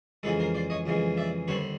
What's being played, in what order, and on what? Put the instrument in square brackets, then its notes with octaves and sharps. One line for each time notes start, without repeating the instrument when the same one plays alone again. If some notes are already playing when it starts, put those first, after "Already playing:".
[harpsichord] F2 C#3 E3 G#3 A4 B4
A#4 C5
C5 D5
C#5 D#5
F2 C#3 E3 G#3
D5 E5
D#2 D3 G3 C4 B4 C#5